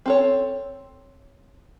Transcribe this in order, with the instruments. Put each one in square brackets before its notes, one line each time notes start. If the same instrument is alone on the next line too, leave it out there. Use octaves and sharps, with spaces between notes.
[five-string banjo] C4 A4 C#5